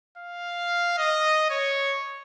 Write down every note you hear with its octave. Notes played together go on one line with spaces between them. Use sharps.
F5
D#5
C#5